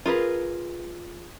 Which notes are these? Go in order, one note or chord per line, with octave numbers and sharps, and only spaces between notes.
F4 G#4 A#4 B4